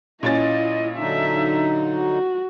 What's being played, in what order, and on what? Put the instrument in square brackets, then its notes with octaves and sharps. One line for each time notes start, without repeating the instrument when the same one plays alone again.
[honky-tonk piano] A#2 C#4 A6 [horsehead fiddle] E4 D#5
[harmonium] D3 F#3 D#4 [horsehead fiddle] D4 E5
[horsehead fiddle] F#4